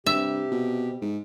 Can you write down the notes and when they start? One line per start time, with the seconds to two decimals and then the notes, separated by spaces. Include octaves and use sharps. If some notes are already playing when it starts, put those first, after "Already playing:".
0.06 G2 C3 G4 E5
0.52 B2
1.02 G#2